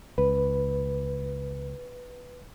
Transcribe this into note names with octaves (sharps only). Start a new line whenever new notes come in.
C#2 B4